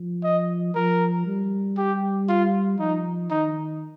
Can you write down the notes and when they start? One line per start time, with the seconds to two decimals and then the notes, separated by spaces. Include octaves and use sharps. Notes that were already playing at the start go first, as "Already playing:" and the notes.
Already playing: F3
0.24 D#5
0.75 F3 A#4
1.26 G3
1.77 G4
2.28 F4
2.79 F3 D#4
3.30 D#3 D#4